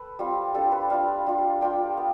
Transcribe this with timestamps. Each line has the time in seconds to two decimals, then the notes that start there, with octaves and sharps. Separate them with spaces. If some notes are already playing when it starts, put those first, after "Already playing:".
Already playing: A4 B4
0.19 G3 C4 F4
0.54 G3 D4 F4 A4
0.72 B4
0.90 G3 D4 F4 F5
1.27 G3 D4 F4
1.61 G3 D4 F4 G5
1.97 B3